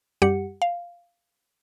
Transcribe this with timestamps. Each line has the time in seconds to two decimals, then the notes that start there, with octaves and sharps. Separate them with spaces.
0.22 F#2 G3 G4 F#5 C#7
0.62 F5